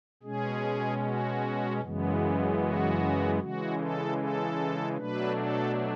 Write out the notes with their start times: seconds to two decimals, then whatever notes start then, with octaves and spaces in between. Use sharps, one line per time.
0.23 B2 G#3 C#4 G#4
1.02 F#4
1.81 F#2 C#3 E3 G#3 B3
2.60 F#4
3.39 C#3 E3 G#3 F#4
3.79 A4
4.18 A4
4.97 B2 F#3 A3 D4 B4
5.36 A4